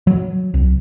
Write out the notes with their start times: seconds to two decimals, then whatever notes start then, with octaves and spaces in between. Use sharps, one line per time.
0.07 F#3
0.54 C2